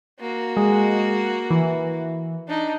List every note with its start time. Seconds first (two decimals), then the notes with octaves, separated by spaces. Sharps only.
0.20 A#3 F#4
0.57 G#3
1.50 E3
2.48 D4 D#4